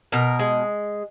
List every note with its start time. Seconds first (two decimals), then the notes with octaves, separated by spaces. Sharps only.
0.12 B2 A#4
0.39 G#3